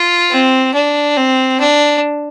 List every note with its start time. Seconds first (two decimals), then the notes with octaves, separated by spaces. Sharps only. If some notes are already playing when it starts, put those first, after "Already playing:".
Already playing: F4
0.30 C4
0.74 D4
1.17 C4
1.60 D4